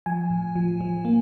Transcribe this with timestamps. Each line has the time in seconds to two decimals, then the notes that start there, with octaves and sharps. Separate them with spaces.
0.06 F3 G#5
0.30 A2
0.56 F3
0.81 F3
1.05 A#3